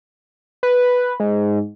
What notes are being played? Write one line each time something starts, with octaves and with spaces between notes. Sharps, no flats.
B4
G#2